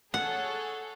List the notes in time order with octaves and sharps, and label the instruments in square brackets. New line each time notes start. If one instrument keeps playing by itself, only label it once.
[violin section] G#4 A4 C#5 [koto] F#5